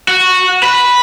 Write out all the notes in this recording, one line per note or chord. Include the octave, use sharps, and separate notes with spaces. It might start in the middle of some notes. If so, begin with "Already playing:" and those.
F#4
B4